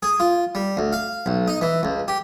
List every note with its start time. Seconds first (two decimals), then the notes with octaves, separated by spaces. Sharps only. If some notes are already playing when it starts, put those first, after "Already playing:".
0.03 G#4
0.20 F4
0.55 G3
0.77 D2
0.93 F5
1.26 B1
1.48 D#4
1.61 E3
1.83 C#2
2.08 G4